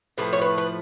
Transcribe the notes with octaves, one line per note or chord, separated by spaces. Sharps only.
A2 F3 A3 B4
C#5
B4
B4